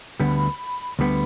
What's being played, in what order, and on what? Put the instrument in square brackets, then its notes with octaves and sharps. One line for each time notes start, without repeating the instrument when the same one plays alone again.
[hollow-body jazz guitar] D2 D3 G3 B3 [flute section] B5
[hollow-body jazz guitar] D2 D3 G3 B3 [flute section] B5